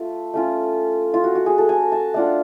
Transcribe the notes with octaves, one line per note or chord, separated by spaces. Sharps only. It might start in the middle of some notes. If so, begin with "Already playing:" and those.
Already playing: A3 F4
A3 C#4 F4
F4
F#4
F#4
G#4
A4
G#5
A5
A3 D4 F4 F#5